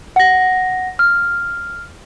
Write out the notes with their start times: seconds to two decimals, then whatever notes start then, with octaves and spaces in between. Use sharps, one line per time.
0.16 F#5 A#6
0.99 F6